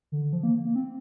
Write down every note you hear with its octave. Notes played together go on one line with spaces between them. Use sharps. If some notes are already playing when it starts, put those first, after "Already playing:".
D3
F3
A#3
A#3
C4